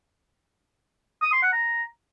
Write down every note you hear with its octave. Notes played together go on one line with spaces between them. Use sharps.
D#6
C6
F#5
A#5